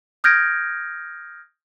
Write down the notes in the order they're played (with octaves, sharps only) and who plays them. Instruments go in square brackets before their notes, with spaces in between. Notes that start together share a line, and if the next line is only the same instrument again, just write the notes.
[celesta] D#6 F6 G6 G#6 A#6 D7